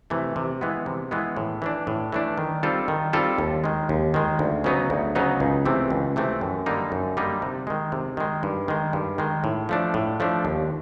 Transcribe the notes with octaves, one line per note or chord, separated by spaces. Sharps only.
C3 E3 A3
C3
E3 G#3 B3
C3
E3 G#3 B3
A2
E3 A3 D4
A2
E3 A3 D4
D#3
G3 C4 F4 A4
D#3
G3 C4 F4 A4
D#2
D#3 G#3
D#2
D#3 G#3
D2
C#3 F#3 B3 D#4
D2
C#3 F#3 B3 D#4
C#2
C3 E3 A3 C4
C#2
C3 E3 A3 C4
F#2
D3 G3 A#3 D#4
F#2
D3 G3 A#3 D#4
C3
D#3 G#3
C3
D#3 G#3
G2
D#3 G#3
G2
D#3 G#3
A2
F3 A3 D4
A2
F3 A3 D4
D#2